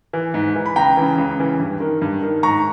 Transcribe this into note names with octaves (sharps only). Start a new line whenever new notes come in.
E3
G#2
E3
B5
C#2 G5 A#5
C#3 E3
C#2
C#3 E3
G2
D#3
G2
D#3
G#2 A#5 C#6